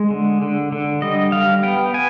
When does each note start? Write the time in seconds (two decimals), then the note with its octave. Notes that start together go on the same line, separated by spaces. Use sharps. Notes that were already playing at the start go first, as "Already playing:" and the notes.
Already playing: G#3
0.10 D3
0.42 D3
0.72 D3
1.02 G3 D#5
1.32 G3 F5
1.63 B3 G5
1.94 B3 G#5